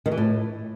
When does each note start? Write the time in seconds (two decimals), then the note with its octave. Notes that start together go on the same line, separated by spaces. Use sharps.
0.06 D#3
0.12 E3
0.17 A2